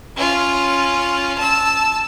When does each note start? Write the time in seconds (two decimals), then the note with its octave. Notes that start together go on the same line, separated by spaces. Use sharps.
0.16 C#4 F4
1.38 A5 E6